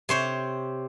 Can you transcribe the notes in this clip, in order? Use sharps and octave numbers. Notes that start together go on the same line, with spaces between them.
C3 C5 C#5